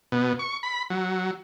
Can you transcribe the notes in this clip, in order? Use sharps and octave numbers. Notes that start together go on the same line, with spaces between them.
B2
C#6
B5
F#3